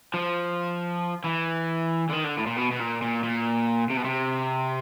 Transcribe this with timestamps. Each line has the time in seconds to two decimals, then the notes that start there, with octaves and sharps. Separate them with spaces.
0.14 F3
1.24 E3
2.09 D3
2.13 D#3
2.24 D3
2.38 A2
2.47 A#2
2.57 B2
2.72 B2
2.80 A#2
3.02 A#2
3.24 A#2
3.90 C3
3.97 B2
4.04 C3